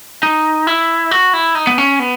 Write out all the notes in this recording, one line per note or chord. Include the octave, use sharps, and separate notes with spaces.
D#4
E4
F#4
E4
D#4
B3
C#4
B3